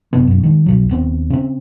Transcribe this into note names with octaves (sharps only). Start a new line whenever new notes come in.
F#1 C3 B3
B1 F#2
D#3 G#3
B1 B2 F#3
D#1 B3 C4
C#3 C4